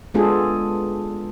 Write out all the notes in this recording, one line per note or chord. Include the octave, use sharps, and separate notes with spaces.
G#3 B3 D4 F4 G#4 A4